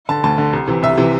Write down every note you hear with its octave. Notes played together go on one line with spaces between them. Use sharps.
D3 A5
D2 A5
D3
C2
C3 E3
C2 E5
C3 E3